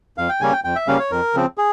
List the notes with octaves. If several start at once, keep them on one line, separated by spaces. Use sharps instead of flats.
F2 F5
G5
C#3 G3 A#3 C#4 G#5
G5
F2 G5
E5
C#3 G3 A#3 C#4 F5
C#5
F2 A#4
C#3 F3 C4
G#4